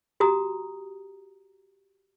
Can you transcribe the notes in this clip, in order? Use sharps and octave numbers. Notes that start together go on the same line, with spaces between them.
F#4 G4 A#5 D#6